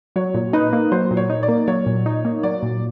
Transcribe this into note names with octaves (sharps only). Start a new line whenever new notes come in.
F#3 C#5
A#2
D#4 B4
A#3
F#3 C5
A#2
C#5
D#4
D5
A#3
F#3 C#5
A#2
D#4
A#3
F#3 D5
A#2